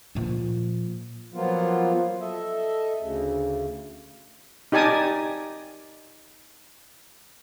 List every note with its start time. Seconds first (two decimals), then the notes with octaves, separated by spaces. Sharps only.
0.15 A#2 F3
1.34 F3 F#3 A#3 B3 F4
2.21 A4 D#5 E5
2.99 D2 C#3
4.72 D#4 G4 D5 G#5 A5 D#6